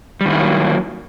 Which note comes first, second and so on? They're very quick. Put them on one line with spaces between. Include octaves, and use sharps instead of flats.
G3 D#3 E4 A#3 F#3